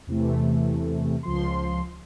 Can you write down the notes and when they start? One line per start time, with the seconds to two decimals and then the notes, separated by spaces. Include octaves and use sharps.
0.07 E2 C3 E3 A3
1.23 C#2 F3 C6